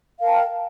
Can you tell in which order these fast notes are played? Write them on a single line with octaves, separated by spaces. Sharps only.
F5 A#4 A5 G5